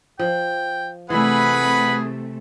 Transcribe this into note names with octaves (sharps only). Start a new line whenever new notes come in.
F3 G5
C3 E3 A3 E4 G#4 B4 F#5 B5